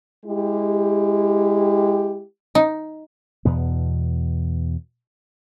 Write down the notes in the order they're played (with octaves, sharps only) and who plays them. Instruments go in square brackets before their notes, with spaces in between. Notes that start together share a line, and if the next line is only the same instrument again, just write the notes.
[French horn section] G#3 E4 G4
[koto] D#4
[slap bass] E2 B2 B3